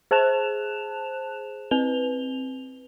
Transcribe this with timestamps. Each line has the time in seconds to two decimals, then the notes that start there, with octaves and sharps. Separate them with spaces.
0.11 G#4 C5 A5 F#6 E7 F7
1.71 C4 B4 F7 G7